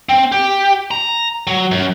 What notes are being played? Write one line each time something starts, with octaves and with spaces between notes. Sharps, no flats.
C4
G4
A#5
F#3
F#2